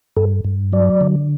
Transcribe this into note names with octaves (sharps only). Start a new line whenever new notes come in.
G2 A4
G2
F#3 D5
D3